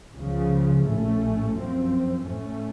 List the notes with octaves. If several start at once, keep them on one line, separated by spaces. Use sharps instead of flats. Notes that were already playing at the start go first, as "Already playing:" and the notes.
C#2 C#3 F3
A#1 A2 A3 C#4
F#2 F3 C4
A2 A3 C#4